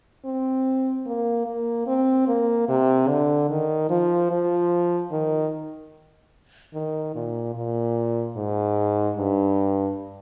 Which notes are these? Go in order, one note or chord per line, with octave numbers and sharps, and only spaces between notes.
C4
A#3
A#3
C4
A#3
C3
D3
D#3
F3
F3
D#3
D#3
A#2
A#2
G#2
G2